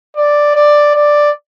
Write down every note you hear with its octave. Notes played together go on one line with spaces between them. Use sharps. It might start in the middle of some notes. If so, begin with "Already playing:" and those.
D5
D5
D5